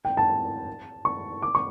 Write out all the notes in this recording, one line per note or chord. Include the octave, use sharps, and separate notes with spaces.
G5
A5
C#6
D6
C#6